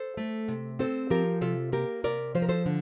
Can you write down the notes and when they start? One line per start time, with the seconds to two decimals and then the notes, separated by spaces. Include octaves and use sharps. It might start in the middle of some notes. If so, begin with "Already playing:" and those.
Already playing: A4 C5
0.17 A3
0.48 C3
0.79 C4 A4 C5
1.10 F3 G4 A#4
1.41 C3 F4 A4
1.72 A#3 G4 A#4
2.04 C3 A#4 D5
2.35 F3 C5
2.42 A#4
2.49 A4 C5
2.66 D3